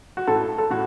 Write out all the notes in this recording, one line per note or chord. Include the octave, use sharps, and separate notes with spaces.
F#4
A2 A4
A4
A2 F#4